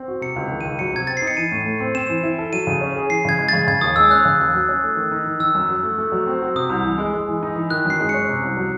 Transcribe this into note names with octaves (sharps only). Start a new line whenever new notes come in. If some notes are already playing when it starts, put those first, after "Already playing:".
Already playing: C4
F#4
C3 C#7
C#2
D#3
C#2 D#7
F#3 C#7
C3 G#6
C4 A6
C7
D#4
C#7
E3 D#7
A2
A3
C4
C4 E7
E3
E4
A4
F#3 D#7
C#3
C#4
G#4
E3 C7
C#3 G#6
G#3
C#3 A6
C#3 G#6
D#2 D#6
G#3 E6
C#4 F#6
C#3
D#2
F#3
C#4
A3
D#3
D#4
D#3
D#3 E6
F#2
F#3
A3
A3
F#3
C4
F#4
C3 D#6
C2
E3
G#3
G#3
E3
D#4
E3
D#3 F#6
F#2 C7
G#3
C#4 C#7
C3
C2
F#3